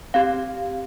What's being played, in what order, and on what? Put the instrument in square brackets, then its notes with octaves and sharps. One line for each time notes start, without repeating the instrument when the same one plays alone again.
[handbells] C4 G4 F5